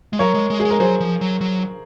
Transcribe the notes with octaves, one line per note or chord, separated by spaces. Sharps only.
G#3
F#3 A#4 C#5
G#3
G#3
G#4
G#3
A#4
F#3 G#4 C5
F3
F#3
F#3